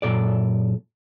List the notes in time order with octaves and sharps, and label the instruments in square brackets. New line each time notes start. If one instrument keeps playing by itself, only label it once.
[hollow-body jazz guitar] F#2 A#2 A4 D5